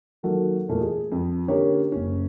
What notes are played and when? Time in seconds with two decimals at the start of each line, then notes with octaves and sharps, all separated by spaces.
0.23 D#3 F#3 A#3 F#4 A4
0.69 E2 A#2 A3 A#3
0.80 G#4
1.12 F2
1.48 D3 A#3 C#4 G4 A#4 C#5
1.92 F#1 C#4